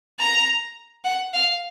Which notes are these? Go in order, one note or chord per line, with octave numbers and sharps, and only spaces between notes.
A#5
F#5
F5